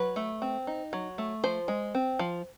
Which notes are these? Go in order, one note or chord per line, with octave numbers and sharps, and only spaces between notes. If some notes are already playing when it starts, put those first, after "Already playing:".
Already playing: F#3 B4
A3
C4
D#4
F#3
A3
F3 C5
G#3
C4
F3